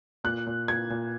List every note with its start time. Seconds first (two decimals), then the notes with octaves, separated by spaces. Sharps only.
0.24 A#2 F#6
0.46 A#2
0.68 A#2 G#6
0.90 A#2